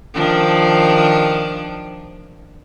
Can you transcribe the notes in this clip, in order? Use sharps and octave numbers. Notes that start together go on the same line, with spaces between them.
D#3 F3 D4